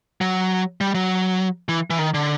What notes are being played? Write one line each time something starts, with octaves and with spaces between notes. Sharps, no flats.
F#3
G3
F#3
E3
E3
D#3
D3